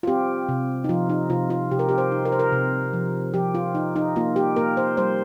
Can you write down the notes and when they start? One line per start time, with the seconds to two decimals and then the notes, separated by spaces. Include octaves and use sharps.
0.03 F4
0.07 C4 G4
0.49 C3
0.84 D#4
0.89 F3 F4
1.09 D#4
1.30 C3 F4
1.50 F4
1.71 C3 G4
1.79 A#4
1.89 G4
1.98 C5
2.12 D#4
2.25 A#4
2.32 C5
2.39 A#4
2.52 C3
2.93 F3
3.34 F3 G4
3.55 F4
3.75 D#4
3.96 D#4
4.16 A#3 F4
4.36 G4
4.56 A#3 A#4
4.77 C5
4.97 G3 C5